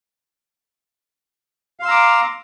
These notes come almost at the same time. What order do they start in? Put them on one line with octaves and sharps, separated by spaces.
F5 C6 E6 A#5 D6